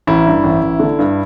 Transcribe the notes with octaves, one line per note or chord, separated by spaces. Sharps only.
A1 E4
G2
A1
A1
D3
G2